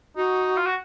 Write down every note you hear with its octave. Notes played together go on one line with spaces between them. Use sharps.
D#4 F#4
F4
F#4